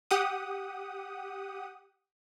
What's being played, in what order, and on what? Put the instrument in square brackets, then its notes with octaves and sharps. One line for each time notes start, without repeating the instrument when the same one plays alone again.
[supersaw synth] G4 F#5 D#6